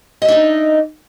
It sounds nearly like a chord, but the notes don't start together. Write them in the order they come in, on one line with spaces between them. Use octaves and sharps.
D#5 E5 D4 D#4